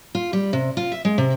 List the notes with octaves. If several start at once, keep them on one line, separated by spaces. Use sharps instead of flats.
F4
G3
C3
F4
E5
G#3
C3